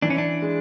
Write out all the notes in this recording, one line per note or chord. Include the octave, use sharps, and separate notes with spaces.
E3 D4
C#4
D4
G#3